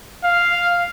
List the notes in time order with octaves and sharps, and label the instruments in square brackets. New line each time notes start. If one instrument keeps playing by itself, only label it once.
[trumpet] F5